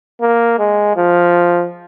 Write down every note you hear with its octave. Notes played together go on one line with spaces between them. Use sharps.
A#3
G#3
F3